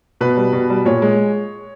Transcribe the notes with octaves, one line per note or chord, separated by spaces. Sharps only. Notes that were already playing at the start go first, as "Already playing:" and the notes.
B2 B4
G3
B2
G3
A#2 C#5
G#3